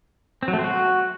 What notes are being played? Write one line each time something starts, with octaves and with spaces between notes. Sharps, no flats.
C4
F#3
A3
C4
F#4